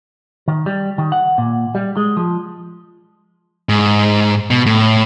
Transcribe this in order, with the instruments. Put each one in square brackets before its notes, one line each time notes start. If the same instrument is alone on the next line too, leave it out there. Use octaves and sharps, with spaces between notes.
[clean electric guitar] D#3
G3
D#3
F#5
A#2
G3
G#3
F3
[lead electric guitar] G#2
B2
A2